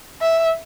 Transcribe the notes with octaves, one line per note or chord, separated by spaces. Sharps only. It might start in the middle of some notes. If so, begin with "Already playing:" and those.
E5